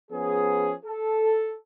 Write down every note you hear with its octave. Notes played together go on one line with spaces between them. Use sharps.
F3 B3 C#4 G#4
A4